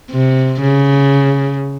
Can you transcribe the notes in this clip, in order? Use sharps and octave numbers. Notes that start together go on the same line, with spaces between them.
C3
C#3